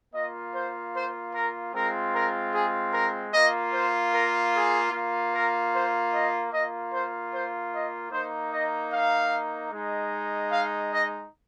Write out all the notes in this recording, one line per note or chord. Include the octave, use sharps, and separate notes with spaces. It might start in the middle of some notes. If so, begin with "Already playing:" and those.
A#3 F4 D#5
C5
C5
A#4
G#3 C4 F4 A#4
A#4
G#4
A#4
A#3 F4 D#5
C5
A#4
G#4
A#3 F4
A#4
C5
D#5
A#3 F4 D#5
C5
C5
D#5
A#3 D#4 C5
D#5
F5
G#3 D#4
F5
D#5